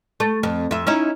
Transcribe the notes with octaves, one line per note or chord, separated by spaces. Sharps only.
A3
F2
F2 E5
C#4 D#4 E4